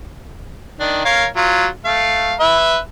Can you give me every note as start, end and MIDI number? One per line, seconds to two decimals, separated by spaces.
0.80 1.01 51
0.80 1.01 62
1.05 1.26 70
1.05 1.26 73
1.05 1.26 77
1.36 1.66 54
1.36 1.66 65
1.85 2.34 57
1.85 2.34 77
2.40 2.78 71
2.40 2.78 76